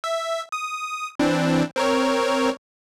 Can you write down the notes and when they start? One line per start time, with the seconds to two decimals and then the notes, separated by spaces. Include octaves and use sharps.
0.04 E5
0.52 D#6
1.19 E3 C4 D4
1.76 C4 A#4 C#5